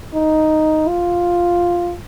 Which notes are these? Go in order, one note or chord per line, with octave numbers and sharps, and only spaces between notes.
D#4
F4